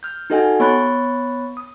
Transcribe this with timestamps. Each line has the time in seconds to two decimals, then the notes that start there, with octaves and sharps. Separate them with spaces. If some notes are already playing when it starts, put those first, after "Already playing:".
0.03 F6 G6
0.30 D#4 F#4 A4 D#5 F#5 G#5
0.60 B3 C#5 B5 C#6 F#6 A6
1.57 D#6